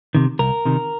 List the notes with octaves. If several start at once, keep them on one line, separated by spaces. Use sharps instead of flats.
C3 D#3
C2 A#4
C3 D#3